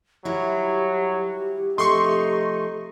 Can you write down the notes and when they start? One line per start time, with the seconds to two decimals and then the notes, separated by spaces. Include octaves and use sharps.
0.25 D#3 F#3 G3 E4 G4
1.78 C3 F3 A3 D#4 C6 C#6